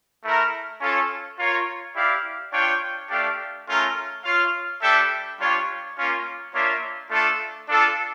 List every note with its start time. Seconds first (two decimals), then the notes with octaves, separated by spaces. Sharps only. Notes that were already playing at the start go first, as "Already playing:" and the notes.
0.24 A3 E4 A#4
0.81 C#4 F4 A4 C#5
1.38 F4 A#4 C#5
1.96 E4 G4 D5 F5
2.53 D4 F4 C#5 G5
3.10 A3 D4 G4 D5 F5
3.68 A3 C#4 F4 A#4
4.25 F4 C#5 F5
4.82 G3 D4 A4 E5 G5
5.39 G3 D4 F4 C#5 F5
5.97 A#3 C#4 F4
6.54 A#3 D4 F4 C#5 E5
7.11 A3 D4 F4 A4
7.69 D4 F4 A4